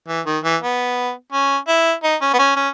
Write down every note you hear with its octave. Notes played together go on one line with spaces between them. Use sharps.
E3
D#3
E3
B3
C#4
E4
D#4
C#4
B3
C#4
C#4